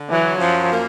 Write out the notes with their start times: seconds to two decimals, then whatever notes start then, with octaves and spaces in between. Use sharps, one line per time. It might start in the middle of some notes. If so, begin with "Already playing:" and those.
Already playing: D3
0.10 E3 F#3
0.40 F#2 F3
0.70 A#3